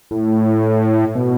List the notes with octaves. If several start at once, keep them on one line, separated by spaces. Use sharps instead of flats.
A2
B2